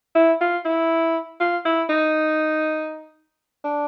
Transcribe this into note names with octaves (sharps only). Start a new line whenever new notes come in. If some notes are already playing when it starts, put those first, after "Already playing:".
E4
F4
E4
F4
E4
D#4
D4